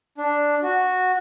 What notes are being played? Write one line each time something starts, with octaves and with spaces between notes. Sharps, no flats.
D4
F#4